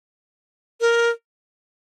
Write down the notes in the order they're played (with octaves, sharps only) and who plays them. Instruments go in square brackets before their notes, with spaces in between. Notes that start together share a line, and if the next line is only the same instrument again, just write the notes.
[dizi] A#4